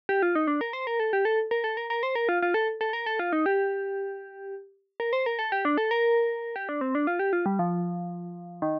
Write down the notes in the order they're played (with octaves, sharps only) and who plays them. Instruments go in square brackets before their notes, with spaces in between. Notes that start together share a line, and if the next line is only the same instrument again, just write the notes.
[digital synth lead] G4
F4
D#4
D4
A#4
C5
A#4
A4
G4
A4
A#4
A4
A#4
A#4
C5
A#4
F4
F4
A4
A4
A#4
A4
F4
D#4
G4
A#4
C5
A#4
A4
G4
D4
A4
A#4
G4
D4
C4
D4
F4
G4
F4
G3
F3
D#3